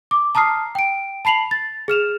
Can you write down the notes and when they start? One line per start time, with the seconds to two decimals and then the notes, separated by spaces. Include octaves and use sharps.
0.11 D6
0.35 A5 A#5 D#6 F6 C7
0.75 G5 D7
1.25 A5 B5 C7 F7 F#7
1.51 A6
1.88 G#4 F6 E7 F7